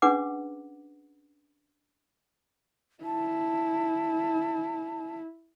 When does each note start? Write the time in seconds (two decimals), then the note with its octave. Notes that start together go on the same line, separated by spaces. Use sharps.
0.02 C#4 D4 G#4 B4 F#5 D6
3.04 E4 A5